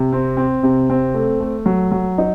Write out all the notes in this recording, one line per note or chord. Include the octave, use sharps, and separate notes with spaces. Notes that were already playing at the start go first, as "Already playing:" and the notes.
Already playing: C3
C4
C4
C3
C4
A3
A3
F#3
F#3
D#4